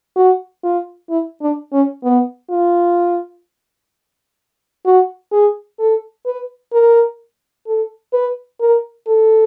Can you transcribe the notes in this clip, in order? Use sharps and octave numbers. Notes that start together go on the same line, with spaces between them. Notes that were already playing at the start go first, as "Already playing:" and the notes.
F#4
F4
E4
D4
C#4
B3
F4
F#4
G#4
A4
B4
A#4
A4
B4
A#4
A4